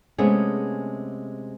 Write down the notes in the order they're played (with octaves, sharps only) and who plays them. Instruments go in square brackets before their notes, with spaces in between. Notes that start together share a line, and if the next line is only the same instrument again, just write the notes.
[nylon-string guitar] C3 G#3 A3 B3 C#4 G#4